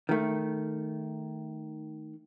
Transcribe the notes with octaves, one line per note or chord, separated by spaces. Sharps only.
D#3 A3